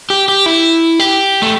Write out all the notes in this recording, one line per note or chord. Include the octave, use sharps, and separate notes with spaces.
G4
G4
E4
G4
A3